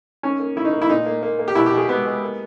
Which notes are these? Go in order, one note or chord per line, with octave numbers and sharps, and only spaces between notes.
D#3 C#4
A#3
D#3 E4
D#4
A#3
E4
A#2 D#4
A#3
A#3
A#3
G4
B2 E4
G4
B2
G#4
G#3 B3
G#3
A#3